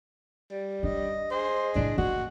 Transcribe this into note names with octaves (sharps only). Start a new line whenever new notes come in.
G3
D4 D#5
G#4 C5 D#5
A2 C#3 D4
A#3 F#4